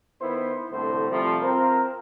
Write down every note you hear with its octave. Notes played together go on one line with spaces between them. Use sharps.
D#3 B3 E4 C5
C2 A2 D3 C5
C3 F3 G3 A3
C4 F4 A#4